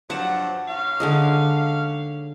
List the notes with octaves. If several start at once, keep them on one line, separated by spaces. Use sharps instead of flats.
G2 F3 F#3 F#5 A5
D#2 C#4 F5
D3 G#3 D#5